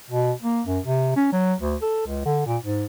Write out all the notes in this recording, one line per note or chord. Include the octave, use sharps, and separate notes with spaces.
B2
A#3
F#2
C3
C#4
F#3
D2
A4
C#2
D3
A#2
G#2